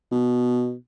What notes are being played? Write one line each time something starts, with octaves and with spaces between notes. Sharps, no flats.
B2